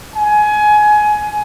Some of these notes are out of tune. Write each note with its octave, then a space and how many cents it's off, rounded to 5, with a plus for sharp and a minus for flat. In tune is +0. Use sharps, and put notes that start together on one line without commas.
G#5 +20